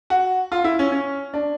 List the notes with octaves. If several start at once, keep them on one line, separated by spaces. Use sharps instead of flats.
F#4
F4
E4
C#4
C#4
D4